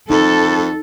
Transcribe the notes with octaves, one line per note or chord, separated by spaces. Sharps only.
F2 D#4 A4